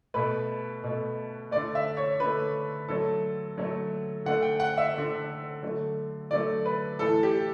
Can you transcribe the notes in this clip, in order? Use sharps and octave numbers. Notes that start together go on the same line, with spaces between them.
B2 A3 B4
B2 A3
D3 A3 D5
E5
C#5
D3 A3 B4
D3 F#3 A3 A4
D3 F#3 A3
D3 A3 F#5
G5
F#5
E5
D3 A3
D3 F#3 A3
D3 F#3 A3 D5
B4
A2 E3 A3 A4
G4